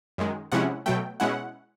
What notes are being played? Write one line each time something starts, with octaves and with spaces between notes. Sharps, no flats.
F#2 D#3 G#3
C3 F3 G#3 C#4 E4 F#5
B2 F#3 A3 G5
B2 G#3 C#4 E4 F#5